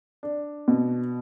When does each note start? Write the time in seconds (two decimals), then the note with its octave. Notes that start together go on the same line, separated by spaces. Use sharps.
0.23 D4
0.68 B2